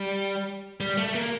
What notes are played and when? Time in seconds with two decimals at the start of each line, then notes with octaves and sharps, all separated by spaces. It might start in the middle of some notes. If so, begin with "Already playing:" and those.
Already playing: G3
0.80 G3
0.98 A3
1.15 A#3